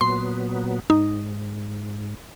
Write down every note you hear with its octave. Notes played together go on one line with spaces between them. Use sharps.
A#2 F#3 B3 C6
G#2 D#4